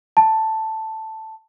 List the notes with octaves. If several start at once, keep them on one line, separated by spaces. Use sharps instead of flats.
A5